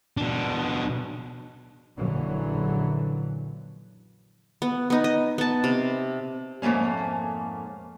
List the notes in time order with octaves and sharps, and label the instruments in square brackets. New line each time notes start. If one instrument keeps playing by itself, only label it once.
[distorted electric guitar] B2 D4
[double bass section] A#1 F#2 D3 E3 F#3
[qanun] B3
B3 D#4
D#5
B3 A5
C3
[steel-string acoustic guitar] F2 G#2 A3 A#3 C#4